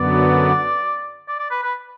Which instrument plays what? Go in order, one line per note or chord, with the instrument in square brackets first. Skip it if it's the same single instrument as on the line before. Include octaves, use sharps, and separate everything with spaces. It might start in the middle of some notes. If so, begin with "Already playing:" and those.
Already playing: [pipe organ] F#2 D3 F#3 B3 [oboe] D5
[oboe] D5
D5
B4
B4